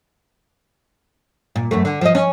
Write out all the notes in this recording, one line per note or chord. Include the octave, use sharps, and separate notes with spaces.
A#2
F#2 E3 A3
D3
F3 D#5
C#4